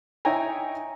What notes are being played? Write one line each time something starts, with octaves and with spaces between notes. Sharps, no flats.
D#4 E4 C#5 G5 G#5 A#5